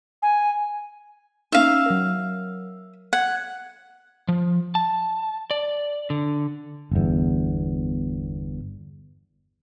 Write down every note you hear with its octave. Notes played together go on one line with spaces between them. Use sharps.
G#5
A#3 C#4 D#4 E5 F5
F#3 A#4
F#5 G#6
F3
A5
D5
D3
G1 E2